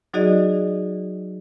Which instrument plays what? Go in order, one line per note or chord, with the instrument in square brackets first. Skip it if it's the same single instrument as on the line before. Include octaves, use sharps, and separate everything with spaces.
[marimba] F#3 D#4 F#4 G#4 D5 D#5